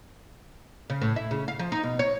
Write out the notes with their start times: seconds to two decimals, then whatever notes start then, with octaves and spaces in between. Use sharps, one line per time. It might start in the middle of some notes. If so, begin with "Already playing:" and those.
0.90 C#3
1.02 A2
1.16 E4
1.31 C#3
1.48 F5
1.59 F3
1.72 D#4
1.84 B2
1.99 C#5